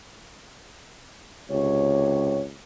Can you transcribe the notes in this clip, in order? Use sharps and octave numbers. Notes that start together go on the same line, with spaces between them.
C#2 C3 G4 C#5